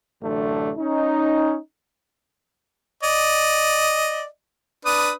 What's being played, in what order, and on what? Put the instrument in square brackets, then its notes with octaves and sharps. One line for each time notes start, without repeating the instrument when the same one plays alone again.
[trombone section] A1 F#2 D3 A3 D4
C#4 D#4
[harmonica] D5 D#5
D4 B4 D#6